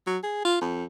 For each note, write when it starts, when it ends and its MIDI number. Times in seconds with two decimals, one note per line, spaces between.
0.07 0.18 54
0.24 0.43 68
0.45 0.58 65
0.61 0.84 41